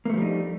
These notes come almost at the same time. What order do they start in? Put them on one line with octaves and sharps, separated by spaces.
A#3 A3 F3 G3 D#4